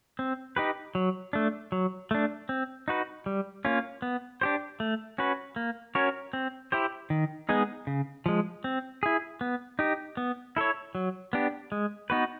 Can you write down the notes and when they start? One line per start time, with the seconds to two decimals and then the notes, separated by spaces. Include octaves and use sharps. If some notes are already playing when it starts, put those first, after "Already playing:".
0.19 C4
0.57 D#4 G4 B4
0.95 F#3
1.33 A3 D4
1.72 F#3
2.11 A3 D4
2.49 C4
2.88 D#4 F#4 B4
3.26 G3
3.65 A#3 C#4 F4
4.02 B3
4.41 D4 G4 C5
4.80 A3
5.18 C#4 F#4 B4
5.56 A#3
5.95 C#4 F#4 A#4 C#5
6.33 C4
6.72 E4 G4 C5
7.10 D#3
7.49 G#3 B3 D#4 G#4
7.87 C#3
8.26 F3 G#3
8.64 C4
9.03 E4 G#4
9.41 B3
9.79 D#4 G4
10.17 B3
10.57 E4 A4 C#5
10.95 F#3
11.33 B3 D4 G4
11.72 G#3
12.10 B3 D#4 F#4 B4